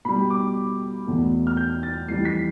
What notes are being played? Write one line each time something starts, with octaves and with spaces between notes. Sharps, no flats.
B2 G3 B5
D6
E2 B2 A3
F6
G6
A6
F2 E3 G3 C7
B6